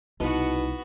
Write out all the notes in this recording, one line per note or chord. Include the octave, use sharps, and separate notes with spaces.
C2 B2 B3 D#4 E4 F#4